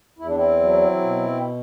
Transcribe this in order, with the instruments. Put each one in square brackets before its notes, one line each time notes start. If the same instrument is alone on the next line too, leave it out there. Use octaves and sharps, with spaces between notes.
[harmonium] E2 E4
D4
C4 E4
F#3
B2